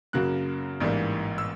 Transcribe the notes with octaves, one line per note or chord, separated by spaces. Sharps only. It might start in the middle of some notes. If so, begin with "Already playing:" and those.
F#2 C#3 F#3 A#3 F#6
A1 G#2 E3 G3 A#3
E6